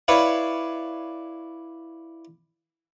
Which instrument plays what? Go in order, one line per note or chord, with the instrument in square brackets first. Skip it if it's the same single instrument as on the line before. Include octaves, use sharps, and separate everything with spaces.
[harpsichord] E4 B4 C#5 D5 F5